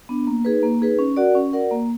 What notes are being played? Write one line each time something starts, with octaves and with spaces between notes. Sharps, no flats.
B3 D4
A#3
D#4 G#4 B4
A#3
D#4 G#4 B4
C#4
F#4 A#4 D5 F#5
C#4
F#4 A#4 D5 F#5
A#3